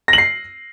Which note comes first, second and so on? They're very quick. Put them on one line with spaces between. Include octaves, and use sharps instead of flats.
A#6 F#7 C7